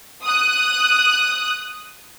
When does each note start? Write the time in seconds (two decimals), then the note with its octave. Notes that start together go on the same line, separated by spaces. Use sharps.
0.23 D#6 F#6